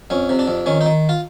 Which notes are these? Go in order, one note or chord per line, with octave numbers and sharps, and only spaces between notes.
F2 C#4
C3
D4
F2
D#3 C#4
D#4
D#3
F4